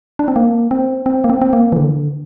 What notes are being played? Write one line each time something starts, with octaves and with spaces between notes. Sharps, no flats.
D4
C4
A#3
C4
C4
A#3
C4
C4
A#3
E3
D3